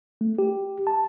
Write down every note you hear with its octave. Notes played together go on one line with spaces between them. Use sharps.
A3
G4
A5